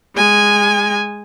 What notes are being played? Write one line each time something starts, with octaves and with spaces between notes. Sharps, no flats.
G#3 G#5